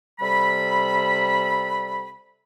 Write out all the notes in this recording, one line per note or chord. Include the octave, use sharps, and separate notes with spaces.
C3 G3 A4 B5